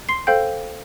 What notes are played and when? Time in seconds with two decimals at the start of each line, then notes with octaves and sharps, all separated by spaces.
0.09 C6 C7
0.27 A4 C5 F5 G5 G6